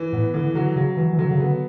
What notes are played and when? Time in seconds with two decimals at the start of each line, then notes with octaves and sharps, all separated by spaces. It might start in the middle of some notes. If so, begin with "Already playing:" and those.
Already playing: E3
0.13 A2 B3
0.34 D3 E3
0.55 D3 F#3
0.76 C#3 F#3
0.97 E3 F#3
1.13 E3
1.19 D3 F#3
1.31 C#3
1.40 D3 B3